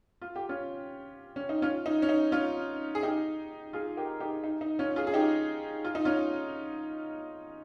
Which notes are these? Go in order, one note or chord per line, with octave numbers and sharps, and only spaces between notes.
F4
G4
C#4 F4
C#4
D#4
C#4 F4
D#4
C#4
D#4
C#4 F4
G#4
D#4 G4
F4 G#4
G4 A#4
D#4 G4
D#4
D#4
C#4 F4
F4 G#4
G#4
D#4 G4
F4
D#4
C#4 F4